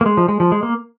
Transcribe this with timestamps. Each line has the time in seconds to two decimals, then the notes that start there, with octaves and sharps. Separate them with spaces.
0.01 A#3
0.06 G#3
0.17 F3
0.28 G#3
0.40 F3
0.52 G#3
0.63 A#3